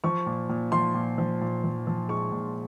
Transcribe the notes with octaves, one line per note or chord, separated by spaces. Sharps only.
F3 C#6
A#2
A#2
F3 C6
A#2
F3
A#2
F3
F3
G#3 C#6
A#2